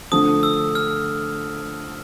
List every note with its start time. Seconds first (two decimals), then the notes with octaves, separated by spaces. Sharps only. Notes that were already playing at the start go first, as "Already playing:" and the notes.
0.12 D3 F3 A3 D#6
0.43 E6
0.75 F6